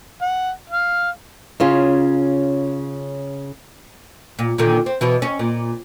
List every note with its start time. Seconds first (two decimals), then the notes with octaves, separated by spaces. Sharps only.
0.22 F#5
0.70 F5
1.60 C#3 C#4 F4
4.39 A#2
4.58 A#2 D3 D#3
4.86 C4
5.01 B2 E3
5.22 C#4
5.39 A#2